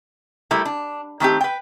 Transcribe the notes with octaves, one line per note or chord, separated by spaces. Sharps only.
G3 A3 E4 A#4
D4
D#3 A3 C4 G4
B4 G5